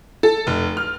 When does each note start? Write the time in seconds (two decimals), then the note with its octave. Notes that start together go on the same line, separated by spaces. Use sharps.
0.23 A4
0.47 F1
0.77 F6